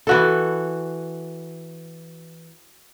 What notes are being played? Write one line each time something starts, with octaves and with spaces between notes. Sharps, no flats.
E3 F#4 A4